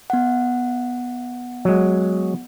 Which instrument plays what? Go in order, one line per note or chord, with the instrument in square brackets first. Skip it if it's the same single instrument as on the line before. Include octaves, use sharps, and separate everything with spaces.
[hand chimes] B3 F#5
[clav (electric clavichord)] F#3 G#3